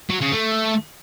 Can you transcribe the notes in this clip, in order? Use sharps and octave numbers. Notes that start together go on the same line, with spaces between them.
F#3
C#3
A3